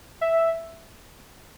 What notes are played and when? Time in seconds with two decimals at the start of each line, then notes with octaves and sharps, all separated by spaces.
0.21 E5